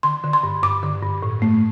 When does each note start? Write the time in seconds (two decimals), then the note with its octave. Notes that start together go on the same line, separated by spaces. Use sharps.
0.03 D3 C6
0.24 D3
0.33 C6
0.43 G2
0.63 G2 D6
0.83 D3
1.02 G2
1.23 A2
1.42 A3